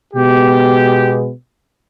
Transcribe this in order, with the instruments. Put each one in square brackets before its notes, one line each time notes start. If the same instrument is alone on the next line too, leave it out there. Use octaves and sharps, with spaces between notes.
[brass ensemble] B2 G#3 B3 G4